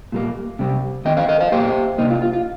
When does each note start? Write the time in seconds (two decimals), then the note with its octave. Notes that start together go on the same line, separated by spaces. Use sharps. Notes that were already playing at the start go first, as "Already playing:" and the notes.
0.12 A#2 G3 A#3
0.59 C3 G3 C4
1.05 D#3 C4 D#5 G5
1.17 C5 F5
1.29 A#4 D#5
1.40 C5 F5
1.52 A#2 G3 A#3 G4 C5
1.98 C3 G3 A#3 D#4
2.10 F4
2.22 F4
2.33 F4